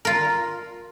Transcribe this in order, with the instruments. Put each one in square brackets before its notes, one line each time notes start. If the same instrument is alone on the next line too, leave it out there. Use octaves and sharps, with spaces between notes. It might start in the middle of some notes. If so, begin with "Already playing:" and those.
[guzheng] F4 A#4